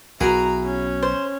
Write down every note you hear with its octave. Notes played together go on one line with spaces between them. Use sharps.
B1 E4 F#4 G#4 A#4 A#5
C#4
C5